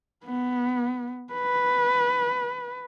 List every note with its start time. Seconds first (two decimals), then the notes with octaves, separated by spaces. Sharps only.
0.24 B3
1.33 B4